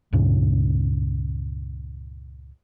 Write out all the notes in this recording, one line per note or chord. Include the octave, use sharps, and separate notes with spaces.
C#2 G2 A#2 C#3